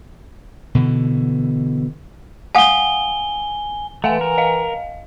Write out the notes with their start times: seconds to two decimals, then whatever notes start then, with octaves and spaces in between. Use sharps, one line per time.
0.75 B2 D3 E3
2.55 F5 F#5 G#5 D#6 G7
4.04 E3 A3 F5 F#5 G#5
4.21 A#4
4.38 D#5 F5